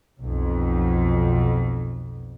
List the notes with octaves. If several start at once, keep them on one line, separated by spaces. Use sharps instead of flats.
B1 F2